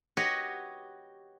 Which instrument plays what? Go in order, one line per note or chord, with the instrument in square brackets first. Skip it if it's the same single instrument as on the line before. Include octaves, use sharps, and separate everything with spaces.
[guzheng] F#4 G4 B4 C#5 D#5 F#5